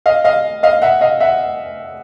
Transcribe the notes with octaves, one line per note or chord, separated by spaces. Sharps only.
D#5 F5
D#5 F5
D#5 F5
E5 F#5
D#5 F5
E5 F#5